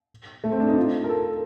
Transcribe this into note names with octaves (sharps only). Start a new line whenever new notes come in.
A3
C4
D4
D#4
F4
A#4
A4